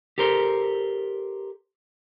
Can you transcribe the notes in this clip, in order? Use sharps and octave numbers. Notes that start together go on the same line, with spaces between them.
G4 A4 A#4 C5